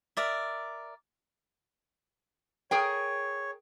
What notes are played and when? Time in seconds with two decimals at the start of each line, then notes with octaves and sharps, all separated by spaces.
0.17 A#4 D5 E5
2.71 G#4 A#4 C#5 G5